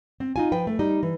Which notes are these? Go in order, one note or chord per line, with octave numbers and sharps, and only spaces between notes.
C4
D#4 F4 G#5
F3 B4 G5
A3
G3 D#4
E3